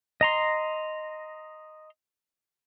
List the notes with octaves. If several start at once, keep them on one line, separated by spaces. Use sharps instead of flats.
D#5 A#5 C6